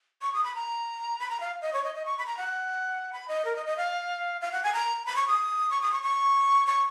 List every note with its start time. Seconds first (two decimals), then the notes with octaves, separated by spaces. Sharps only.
0.22 C#6
0.33 D#6
0.44 B5
0.55 A#5
1.19 B5
1.29 A#5
1.40 F5
1.62 D#5
1.73 C#5
1.83 D#5
1.95 D#5
2.05 C#6
2.18 B5
2.26 A#5
2.37 F#5
3.13 B5
3.28 D#5
3.45 A#4
3.56 D#5
3.66 D#5
3.77 F5
4.41 F5
4.52 F#5
4.63 G#5
4.73 A#5
5.06 B5
5.16 C#6
5.27 D#6
5.70 C#6
5.81 D#6
5.92 C#6
6.03 C#6
6.67 C#6